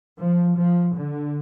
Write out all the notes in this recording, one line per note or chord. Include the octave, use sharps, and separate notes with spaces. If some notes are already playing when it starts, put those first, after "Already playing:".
F3
F3
D3